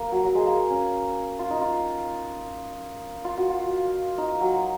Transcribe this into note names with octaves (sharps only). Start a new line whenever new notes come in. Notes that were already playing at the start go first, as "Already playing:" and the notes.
Already playing: A#3
F#3
F#3
G#3
A#3
C#4
F4
D#4
F4
F4
F#4
F4
D#4
F#3